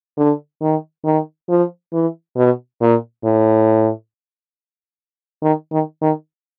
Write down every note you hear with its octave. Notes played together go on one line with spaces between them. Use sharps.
D3
D#3
D#3
F3
E3
B2
A#2
A2
D#3
D#3
D#3